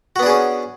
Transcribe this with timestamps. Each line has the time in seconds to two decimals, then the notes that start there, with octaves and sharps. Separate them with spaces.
0.16 F#4
0.19 B3
0.23 D4
0.26 G#4
0.30 C#4